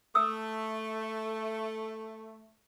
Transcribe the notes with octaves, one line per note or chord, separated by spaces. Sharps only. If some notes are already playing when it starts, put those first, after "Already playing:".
A3 D#6 E6